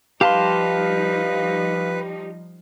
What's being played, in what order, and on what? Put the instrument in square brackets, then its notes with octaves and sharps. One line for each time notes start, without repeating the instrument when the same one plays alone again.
[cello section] F3 G3 D#4 [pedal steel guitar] G4 A5 C6 [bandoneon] B4 [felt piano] F5